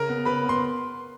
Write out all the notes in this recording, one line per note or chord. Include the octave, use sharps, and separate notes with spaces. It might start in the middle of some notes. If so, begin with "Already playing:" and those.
Already playing: C#3 A#4 A#5
B3
C#3 B4 B5
B3
C6